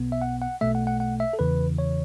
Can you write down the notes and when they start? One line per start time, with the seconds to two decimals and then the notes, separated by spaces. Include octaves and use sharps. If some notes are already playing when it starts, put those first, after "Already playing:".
Already playing: B1 B2 B3
0.12 E5
0.22 F#5
0.42 F#5
0.61 B1 B2 A3 E5
0.75 F#5
0.87 F#5
1.00 F#5
1.20 E5
1.33 A4
1.39 E2 C#3 E3 B4
1.78 C#5